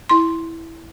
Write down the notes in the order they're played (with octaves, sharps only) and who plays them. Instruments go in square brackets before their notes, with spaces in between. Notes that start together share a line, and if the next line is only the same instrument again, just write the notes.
[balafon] E4 C6